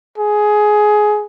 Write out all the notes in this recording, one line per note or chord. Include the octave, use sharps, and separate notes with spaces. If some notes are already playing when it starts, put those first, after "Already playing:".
G#4